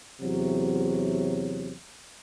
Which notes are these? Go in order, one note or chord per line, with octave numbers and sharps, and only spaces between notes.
E2 C3 F#3